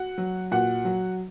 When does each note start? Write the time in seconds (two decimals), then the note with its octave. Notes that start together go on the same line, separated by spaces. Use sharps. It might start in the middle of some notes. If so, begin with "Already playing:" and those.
Already playing: F#4 F#5
0.18 F#3
0.51 A#2 F#4 F#5
0.85 F#3